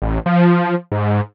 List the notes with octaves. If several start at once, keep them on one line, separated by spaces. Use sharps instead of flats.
A1
F3
G#2